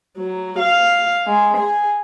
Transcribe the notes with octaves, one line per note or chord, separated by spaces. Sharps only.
F#3
F5
G#3
G#4